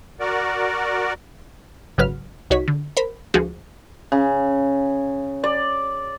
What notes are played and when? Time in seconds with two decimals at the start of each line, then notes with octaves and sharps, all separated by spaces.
0.20 F#4 A#4 D5
1.98 G#1 C#3 F#3 B4 F6
2.50 C2 D#4 F#4 C#5 B6
2.68 D3
2.97 A#4 C5 B5
3.34 D2 F3 G#3 F#4 G#4
4.12 C#3
5.44 D5